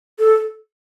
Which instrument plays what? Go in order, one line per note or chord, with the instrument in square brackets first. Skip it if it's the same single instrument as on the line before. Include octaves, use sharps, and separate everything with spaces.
[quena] A4